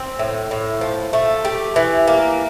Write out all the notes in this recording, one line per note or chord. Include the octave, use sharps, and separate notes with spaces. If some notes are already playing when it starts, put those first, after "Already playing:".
Already playing: C4
A2
A2
F3
A3
G4
E3
A#3